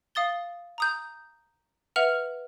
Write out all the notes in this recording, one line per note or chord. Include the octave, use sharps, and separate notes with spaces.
F5 D#6 A6 G7
A#5 D#6 G6
B4 E5 F#5 F6 F7 F#7